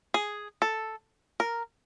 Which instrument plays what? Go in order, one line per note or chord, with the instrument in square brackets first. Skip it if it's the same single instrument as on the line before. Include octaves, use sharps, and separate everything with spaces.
[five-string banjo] G#4
A4
A#4